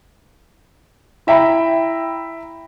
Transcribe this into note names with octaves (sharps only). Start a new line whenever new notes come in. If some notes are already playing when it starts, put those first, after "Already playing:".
E4 E5 G5 A#5 B5